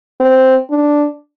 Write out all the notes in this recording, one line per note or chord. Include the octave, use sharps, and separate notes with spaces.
C4
D4